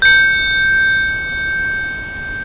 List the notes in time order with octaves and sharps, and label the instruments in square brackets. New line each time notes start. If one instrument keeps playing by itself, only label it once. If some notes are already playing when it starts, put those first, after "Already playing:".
[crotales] G6 C#7